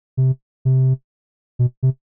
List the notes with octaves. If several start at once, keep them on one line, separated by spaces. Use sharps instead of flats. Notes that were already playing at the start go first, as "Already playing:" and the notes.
C3
C3
B2
C3